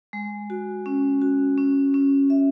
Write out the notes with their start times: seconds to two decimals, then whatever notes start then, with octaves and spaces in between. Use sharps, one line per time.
0.13 G#3
0.50 F#4
0.86 C#4
1.21 F#4
1.58 C#4
1.94 C#4
2.30 E5